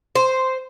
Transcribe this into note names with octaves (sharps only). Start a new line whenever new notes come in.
C5